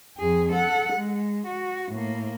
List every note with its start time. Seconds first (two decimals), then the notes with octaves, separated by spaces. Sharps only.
0.18 F2 G#4
0.52 A4 F#5
0.93 G#3
1.47 F#4
1.92 A2 A#3